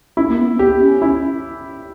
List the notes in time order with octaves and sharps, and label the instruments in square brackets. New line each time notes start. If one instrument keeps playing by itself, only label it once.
[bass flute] C#4 [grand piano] E4
[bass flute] A#3
B3
C#4
[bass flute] B3 [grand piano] G4
[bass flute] C#4
[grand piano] E4